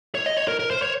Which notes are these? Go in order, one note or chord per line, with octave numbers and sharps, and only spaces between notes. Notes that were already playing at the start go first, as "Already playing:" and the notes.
C#5
D#5
C#5
A#4
A#4
C5
C#5